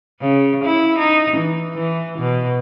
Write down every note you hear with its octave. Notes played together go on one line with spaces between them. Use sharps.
C#3
E4
D#4
E3
E3
B2